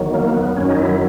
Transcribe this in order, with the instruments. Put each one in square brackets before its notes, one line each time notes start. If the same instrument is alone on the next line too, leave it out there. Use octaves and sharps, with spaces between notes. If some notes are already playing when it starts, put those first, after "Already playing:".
Already playing: [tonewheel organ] E2 D#3 F#3
A#3
B3
F#2 D#3 F#3 C#4
D#4
E4